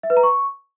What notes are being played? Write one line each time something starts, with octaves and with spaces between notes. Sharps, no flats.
E5
B4
A#5
C#6